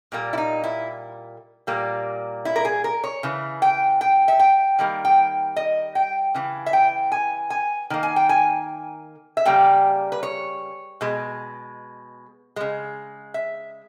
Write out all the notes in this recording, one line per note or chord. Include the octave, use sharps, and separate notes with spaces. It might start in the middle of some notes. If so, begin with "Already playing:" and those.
A#2 G3 A#3
E4
D#4
E4
A#2 G3 A#3
E4
A#4
G#4
A#4
C#5
C#3 E3
G5
G5
E5
G5
D#3 G3 A#3
G5
D#5
G5
C#3 E3
E5
G5
G#5
G#5
D#3 A#3
G#5
G5
G#5
E5
C#3 G3 A#3 G5
B4
C#5
B2 G#3
C#3 G#3
E5